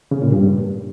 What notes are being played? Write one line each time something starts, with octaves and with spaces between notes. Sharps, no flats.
C#3
A#2
G2